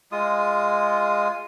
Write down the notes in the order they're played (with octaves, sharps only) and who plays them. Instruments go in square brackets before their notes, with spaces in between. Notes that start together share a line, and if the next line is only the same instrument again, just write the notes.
[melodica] G#3 F4 D#6